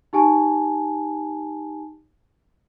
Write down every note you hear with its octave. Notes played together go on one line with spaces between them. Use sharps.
D#4 G4 G#5 A5